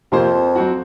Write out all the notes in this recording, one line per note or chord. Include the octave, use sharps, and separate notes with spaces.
F2 C3 F3 A#3 F4 C5
F#3 C4 F#4